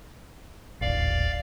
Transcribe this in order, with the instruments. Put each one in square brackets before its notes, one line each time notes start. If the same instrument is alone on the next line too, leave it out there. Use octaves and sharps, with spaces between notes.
[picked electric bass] D#1 A1 [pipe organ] D5 F5